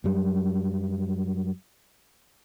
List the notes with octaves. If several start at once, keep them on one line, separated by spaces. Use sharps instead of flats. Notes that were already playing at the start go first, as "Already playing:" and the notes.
F#2 F#3 G3